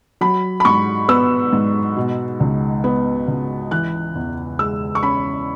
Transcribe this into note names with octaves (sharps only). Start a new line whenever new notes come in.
F#3 B5
B5
G#2 C#6
B3 E6
G#2
B2
C#2
B3
C#2
E3 F#6
E2
G#3 E6
C#6
C#4 B5